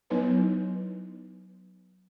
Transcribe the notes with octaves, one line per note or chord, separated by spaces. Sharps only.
F#3 B3 D#4 E4 B4 C#5